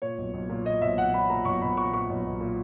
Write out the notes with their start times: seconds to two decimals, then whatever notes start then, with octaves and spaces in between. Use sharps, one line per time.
0.02 A#2 C#5
0.18 B1
0.34 B1
0.50 A#2
0.66 A#2 D#5
0.81 B1 E5
0.98 B1 F#5
1.14 A#2 B5
1.30 A#2 A#5
1.45 B1 C#6
1.62 B1 B5
1.77 A#2 C#6
1.93 A#2 C#6
2.09 B1
2.26 B1
2.41 A#2